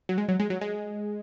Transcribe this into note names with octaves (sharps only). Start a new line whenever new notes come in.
F#3
G#3
F#3
G#3
F#3
G#3